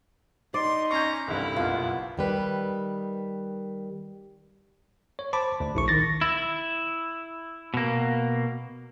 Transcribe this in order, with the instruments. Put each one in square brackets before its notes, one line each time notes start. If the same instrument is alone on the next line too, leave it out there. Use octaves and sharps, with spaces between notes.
[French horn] D#4 [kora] D5 [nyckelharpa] C6
[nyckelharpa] C#4 A#5 [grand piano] C#6 G6
[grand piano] C2 G2 [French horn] D3 [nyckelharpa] E4
[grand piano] F#1 B1 [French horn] B3 [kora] F4
[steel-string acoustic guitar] D#3 G3 B4
[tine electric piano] C#5
C5 A5 B5 D6
D2
A#1 E4 C#6
D#3 A6 A#6
[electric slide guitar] E4
B2 A#3